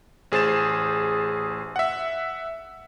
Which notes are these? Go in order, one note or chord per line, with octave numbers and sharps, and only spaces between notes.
A1 G#4 C5 A6 E7
E5 F#5